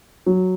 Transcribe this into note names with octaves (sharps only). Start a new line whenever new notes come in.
F#3